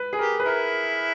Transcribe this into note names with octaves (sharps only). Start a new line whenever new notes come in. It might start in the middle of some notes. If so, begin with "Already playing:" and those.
Already playing: B4
G#4
G4 A#4
B4
E4 A#4